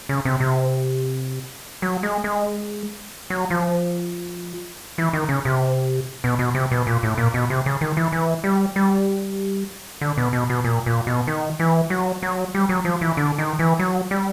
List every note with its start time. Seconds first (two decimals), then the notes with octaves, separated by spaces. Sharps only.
0.09 C#3
0.25 C3
0.40 C3
1.82 F#3
2.03 G#3
2.24 G#3
3.30 F#3
3.50 F3
4.98 E3
5.13 D#3
5.29 C#3
5.45 C3
6.24 B2
6.39 B2
6.55 C3
6.71 B2
6.87 A#2
7.03 A2
7.18 A#2
7.34 B2
7.50 C3
7.66 C#3
7.81 D#3
7.97 E3
8.12 E3
8.44 G3
8.76 G3
10.01 D3
10.17 B2
10.33 B2
10.49 B2
10.64 A#2
10.86 A#2
11.07 B2
11.27 D#3
11.59 E3
11.90 F#3
12.22 F#3
12.54 G3
12.69 F#3
12.85 F3
13.01 E3
13.17 D3
13.38 D#3
13.59 E3
13.79 F#3
14.11 G3